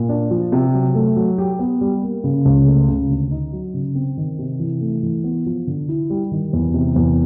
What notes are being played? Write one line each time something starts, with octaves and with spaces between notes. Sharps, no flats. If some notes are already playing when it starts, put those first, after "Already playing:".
Already playing: A#2
D4
F3
C3
F#3
A3
F#3
G4
B3
G3
A#3
C#3
C#2
A3
C#3
D2
D#4
F#3
C#3
C4
D#3
C3
E3
A3
E3
B3
F3
D3
E4
G3
D#3
E2
C3
E2